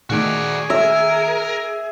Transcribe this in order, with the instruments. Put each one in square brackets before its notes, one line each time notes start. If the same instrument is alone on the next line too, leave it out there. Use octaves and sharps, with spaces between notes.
[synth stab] A#2 D#3 A3 [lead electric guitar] F#4 D5 [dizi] G#4
[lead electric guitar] A#4 [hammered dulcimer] E5